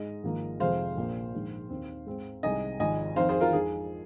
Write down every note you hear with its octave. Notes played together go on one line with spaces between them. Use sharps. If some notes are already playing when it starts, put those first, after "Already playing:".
Already playing: G#2 G#3 D#5
G#1 G#2 F3 A#3 D#4
F1 F2 C3 F3 G#3 C5 F5
A#1 A#2 A#3
A#1 G#2 D#3
D#2 D#3 C4
G#2 G#3 C4 D#4
C2 C3 G#3 D#4 D#5 G#5
G#1 G#2 F3 D#5 G#5
F2 D#3 C4 D#4 C5 F5
G#4 C5
F4 A#4
F2 F3 G#3 D#4 G#4